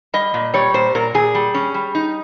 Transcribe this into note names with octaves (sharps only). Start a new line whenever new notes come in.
G3 D#5
A#2
G3 C#5
A#2 C5
A#2 A#4
A#2 G#4
G3
C#4
G3
D#4